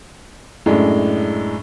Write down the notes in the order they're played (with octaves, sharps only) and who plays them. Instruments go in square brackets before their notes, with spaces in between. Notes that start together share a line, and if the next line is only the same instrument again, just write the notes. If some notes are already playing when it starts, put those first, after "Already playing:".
[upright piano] F#2 A2 G#3 D4